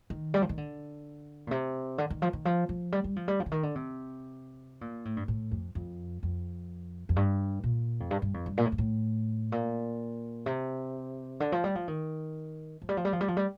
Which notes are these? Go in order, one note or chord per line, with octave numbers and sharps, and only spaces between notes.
D#3
G3
F3
D#3
D3
A#2
C3
D3
D#3
F3
D#3
F3
F3
G3
G3
F3
G3
F3
D3
D#3
D3
C3
A#2
A2
G2
A2
F2
F2
F2
F2
G2
A#2
F2
G2
G2
F2
G2
A#2
A2
G2
A2
A#2
C3
D3
F3
G3
F3
D#3
F3
G3
F3
G3
F3
G3
F3
G3